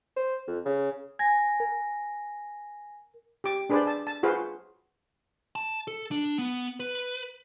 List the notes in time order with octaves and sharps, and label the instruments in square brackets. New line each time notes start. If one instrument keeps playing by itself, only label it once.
[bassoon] C5
F2
C#3
[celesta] G#5 A#6 [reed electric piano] G#6
[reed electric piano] A#4
[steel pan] G4 D6
D4 G#4 B4 C5 D5
A5
A5
F4 F#4 G#4 B4 C5 F5
[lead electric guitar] A5
A4
D4
B3
B4